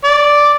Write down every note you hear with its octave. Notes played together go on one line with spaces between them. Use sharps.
D5